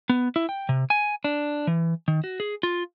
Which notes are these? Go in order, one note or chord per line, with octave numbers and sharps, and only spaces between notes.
B3
E4
G5
C3
G#5
D4
E3
D#3
F#4
G#4
F4